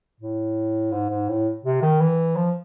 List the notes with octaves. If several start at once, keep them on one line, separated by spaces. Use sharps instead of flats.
A2
G#2
G#2
A2
C3
D#3
E3
F3